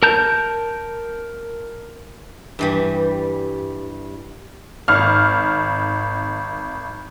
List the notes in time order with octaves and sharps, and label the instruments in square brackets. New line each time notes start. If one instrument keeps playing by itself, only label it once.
[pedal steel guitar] A#4 A5 A#5 G6
[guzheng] G2 E3 G3
[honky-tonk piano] G#1 F6